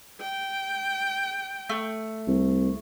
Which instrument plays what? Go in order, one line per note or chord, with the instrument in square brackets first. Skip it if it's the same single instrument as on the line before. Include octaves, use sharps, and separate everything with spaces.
[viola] G5
[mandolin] A3
[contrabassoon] C2